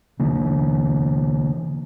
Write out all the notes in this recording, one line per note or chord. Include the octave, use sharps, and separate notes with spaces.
D3 E3 A#3